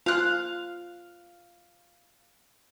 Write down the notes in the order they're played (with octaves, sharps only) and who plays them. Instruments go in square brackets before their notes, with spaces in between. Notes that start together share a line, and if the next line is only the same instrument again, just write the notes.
[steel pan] F4 [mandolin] F5 F#6